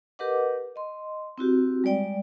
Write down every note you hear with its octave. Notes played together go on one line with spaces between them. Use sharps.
G4 A#4 B4 D#5 F#5 D6
D#5 C6
C4 E4 F#4 G4
G3 G#3 D5 G5